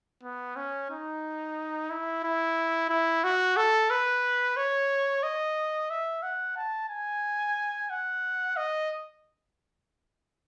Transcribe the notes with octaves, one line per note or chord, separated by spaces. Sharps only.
B3
C#4
D#4
E4
E4
E4
F#4
A4
B4
C#5
D#5
E5
F#5
A5
G#5
F#5
D#5